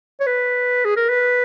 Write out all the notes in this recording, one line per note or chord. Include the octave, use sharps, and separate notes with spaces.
C#5
B4
G#4
A#4
B4